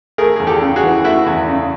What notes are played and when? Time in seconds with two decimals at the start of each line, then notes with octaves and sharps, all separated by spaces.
0.18 A3 G#4 A#4
0.36 E2 G#4
0.47 G4 A4
0.61 C#3
0.76 F#4 G#4
0.83 E3
1.04 A3 E4 F#4
1.26 E2
1.48 C#3